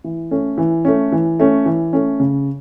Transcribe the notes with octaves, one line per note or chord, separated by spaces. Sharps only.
E3
A3 C#4
E3
A3 C#4
E3
A3 C#4
E3
A3 C#4
C#3